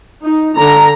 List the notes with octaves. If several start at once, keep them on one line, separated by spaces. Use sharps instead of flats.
D#4
D3 A#5